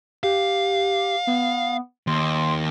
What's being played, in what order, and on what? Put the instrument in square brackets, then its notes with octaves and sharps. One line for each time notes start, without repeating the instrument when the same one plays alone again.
[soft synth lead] G4 [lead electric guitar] F5
[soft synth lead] B3
[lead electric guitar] D#2 [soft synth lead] C6